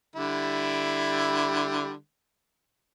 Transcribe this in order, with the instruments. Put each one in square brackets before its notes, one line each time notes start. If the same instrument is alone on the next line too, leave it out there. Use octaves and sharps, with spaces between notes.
[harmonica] D3 G3 E4